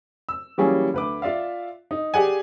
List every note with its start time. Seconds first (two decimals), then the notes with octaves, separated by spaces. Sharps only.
0.29 E6
0.58 E3 F#3 G3 A#3 C#4 G#4
0.94 D2 B4 D6
1.22 F4 D5 E5 F5
1.91 D#4
2.14 G4 G#4 D5 F#5 G#5